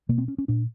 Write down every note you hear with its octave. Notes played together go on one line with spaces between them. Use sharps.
B2 A#3
C4
C#4
C#4
A#2 D4